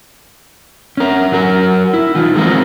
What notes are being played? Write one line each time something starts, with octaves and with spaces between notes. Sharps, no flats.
C#4 A#4
F#3 F#4 A#4
E4
E3 D#4 F4
F3 G#3 B3 C4 A#4